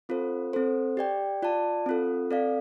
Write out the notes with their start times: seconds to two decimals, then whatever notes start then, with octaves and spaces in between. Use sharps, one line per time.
0.09 C4 F4 A4 C5
0.53 C4 A4 C5
0.97 G4 D5 G5
1.43 F4 D5 A5
1.86 C4 F4 A4
2.31 C4 A4 D5 F5